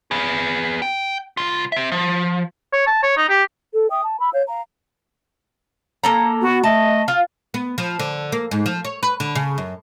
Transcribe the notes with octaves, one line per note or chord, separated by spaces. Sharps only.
B3 G#4
G5
C2 F4
C4 E5
F3
C#5
A5
C#5
D#4
G4
A4
E5 G5 D#6
A5
B5 E6
C#5 F5 G6
F5 A#5
A#3 A4 A#5
B3 F#4
A3 D#5 A5
F4
B3
F3
D3
A#3
G#2
F3
C#5
B4
D3
C#3
F#2